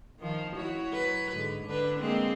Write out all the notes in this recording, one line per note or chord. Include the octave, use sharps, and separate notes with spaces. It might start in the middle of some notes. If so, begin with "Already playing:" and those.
D#3 F3
E4 F#4 C#5
F#3 B4
G#2 D3
D3 D4 B4
G#3 A#3 C4